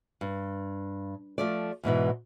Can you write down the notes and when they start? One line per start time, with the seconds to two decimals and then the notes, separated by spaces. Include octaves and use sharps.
0.21 G2
1.38 F3 A3 D5
1.83 E2 G#2 B2 E3